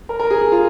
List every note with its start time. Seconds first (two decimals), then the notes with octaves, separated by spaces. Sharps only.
0.09 A#4
0.20 A#4
0.31 G#4
0.41 G#4
0.52 F4